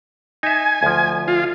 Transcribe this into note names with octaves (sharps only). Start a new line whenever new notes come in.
D#4 E5 G#5
D2 F3
F4